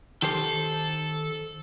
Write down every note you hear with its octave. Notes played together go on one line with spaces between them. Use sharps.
D#3 G4 A4 C5